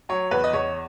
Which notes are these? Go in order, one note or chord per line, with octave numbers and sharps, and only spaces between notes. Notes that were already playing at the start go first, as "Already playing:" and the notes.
F#3 C#5
E2 B4
D#5
E2 C#5